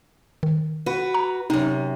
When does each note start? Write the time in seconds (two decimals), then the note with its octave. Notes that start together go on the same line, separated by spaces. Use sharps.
0.43 D#3
0.86 F#4 B4
1.14 A#5
1.50 F#2 C3 D#4